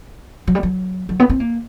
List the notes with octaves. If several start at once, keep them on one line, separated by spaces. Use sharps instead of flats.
F#3
G3
F#3
F#3
B3
C4
A#3